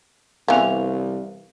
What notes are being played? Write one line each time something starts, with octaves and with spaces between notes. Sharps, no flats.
C2 E3 B3 F5 F7